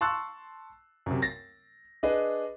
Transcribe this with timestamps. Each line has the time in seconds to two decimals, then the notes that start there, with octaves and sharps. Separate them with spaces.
0.01 A5 C6 C#6 E6 F#6 A6
1.06 F#2 C3
1.22 A6 A#6
2.03 D4 G#4 B4 D#5